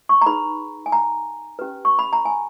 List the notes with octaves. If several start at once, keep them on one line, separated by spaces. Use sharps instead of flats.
C#6
A#5
D#4 G#4 B4 B5
G#5
A#5
C#4 G4 B4
C#6
B5
A#5
G#5